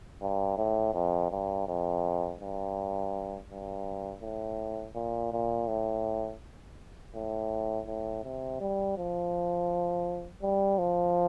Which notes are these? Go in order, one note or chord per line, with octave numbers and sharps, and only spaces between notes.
G2
A2
F2
G2
F2
G2
G2
A2
A#2
A#2
A2
A2
A2
C3
G3
F3
G3
F3